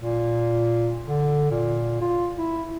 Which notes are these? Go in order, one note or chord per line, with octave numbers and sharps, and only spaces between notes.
A#2
D3
A#2
F4
E4